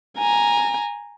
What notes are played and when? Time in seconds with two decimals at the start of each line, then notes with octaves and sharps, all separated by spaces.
0.18 G#5 A#5